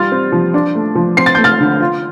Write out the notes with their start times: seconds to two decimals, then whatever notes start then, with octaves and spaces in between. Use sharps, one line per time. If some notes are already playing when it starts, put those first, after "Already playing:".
Already playing: G3 F4 F6 A6
0.12 C4
0.32 F3
0.54 D4
0.75 A3
0.95 F3
1.17 C4 C7
1.26 A6
1.35 A3 G6
1.44 F6 A6
1.60 D3
1.80 F4